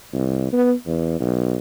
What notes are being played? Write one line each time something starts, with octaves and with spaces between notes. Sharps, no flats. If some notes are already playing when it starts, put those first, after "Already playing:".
C2
B3
E2
B1